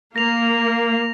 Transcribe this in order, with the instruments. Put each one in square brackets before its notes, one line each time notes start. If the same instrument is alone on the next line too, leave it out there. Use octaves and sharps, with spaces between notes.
[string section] A#3 [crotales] A#6 F7